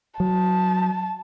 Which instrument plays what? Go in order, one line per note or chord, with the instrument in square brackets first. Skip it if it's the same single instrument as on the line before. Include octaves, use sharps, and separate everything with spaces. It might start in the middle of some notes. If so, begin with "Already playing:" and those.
[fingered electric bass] F#3 [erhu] A5